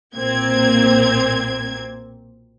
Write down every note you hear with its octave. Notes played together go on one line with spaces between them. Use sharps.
B1 A#2 A#3 C4 G#6